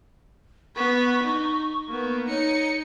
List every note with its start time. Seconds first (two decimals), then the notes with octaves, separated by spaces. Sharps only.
0.76 B3 B5 C#6
1.23 D#4
1.89 A#3 B3
2.29 D#4 C#5 C#7